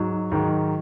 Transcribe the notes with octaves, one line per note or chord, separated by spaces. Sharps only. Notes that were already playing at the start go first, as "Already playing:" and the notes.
Already playing: G#2 F#3
G#2 D#3 F#3